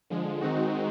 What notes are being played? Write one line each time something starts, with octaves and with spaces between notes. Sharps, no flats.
D3 F3 G#3
D#3 G#3 C4 D#4 F#4